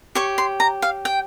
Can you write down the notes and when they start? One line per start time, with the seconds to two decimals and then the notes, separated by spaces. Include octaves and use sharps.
0.15 G4 C#5 C#6
0.38 C6
0.60 A#5
0.82 F5
1.05 G5